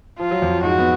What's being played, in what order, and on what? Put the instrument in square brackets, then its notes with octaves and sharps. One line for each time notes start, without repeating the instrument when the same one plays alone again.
[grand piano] F3 [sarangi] F4
[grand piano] F#3
F2 F3
[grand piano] G#2 G#3 [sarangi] F#4
[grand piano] B3